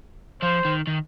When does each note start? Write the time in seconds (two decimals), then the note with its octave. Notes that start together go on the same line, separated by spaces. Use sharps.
0.42 F3 C5
0.65 D#3
0.87 D#3